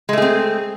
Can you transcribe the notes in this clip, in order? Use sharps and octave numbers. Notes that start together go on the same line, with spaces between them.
G#3 A3 C4 G#4